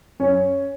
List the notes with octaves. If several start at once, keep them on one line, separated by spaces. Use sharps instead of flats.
F#2 C#4 C#5